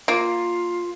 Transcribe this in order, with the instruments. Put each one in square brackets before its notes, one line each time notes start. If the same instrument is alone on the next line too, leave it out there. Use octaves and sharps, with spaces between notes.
[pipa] A#3 [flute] F4